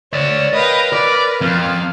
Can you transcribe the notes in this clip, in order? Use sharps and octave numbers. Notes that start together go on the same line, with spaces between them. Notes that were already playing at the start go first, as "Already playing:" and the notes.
C#5 D5 E5
A#4 B4 D#5 F5 G5
B4 D5
F2 A#4 F5